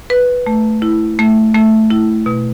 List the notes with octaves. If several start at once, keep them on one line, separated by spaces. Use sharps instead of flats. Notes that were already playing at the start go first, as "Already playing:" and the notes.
B4
A3
E4
A3
A3
E4
B2